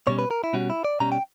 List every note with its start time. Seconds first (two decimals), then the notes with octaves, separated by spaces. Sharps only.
0.07 B2 G3 C#4 C#5
0.19 B4
0.31 A#4
0.44 E4
0.53 B2 G3 C#4 F#4
0.70 E4
0.85 D5
1.00 B2 G3 C#4 A#5
1.12 G5